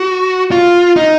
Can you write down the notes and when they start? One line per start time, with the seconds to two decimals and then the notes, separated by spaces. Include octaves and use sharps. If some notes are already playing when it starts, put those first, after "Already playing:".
Already playing: F#4
0.52 F4
0.96 D#4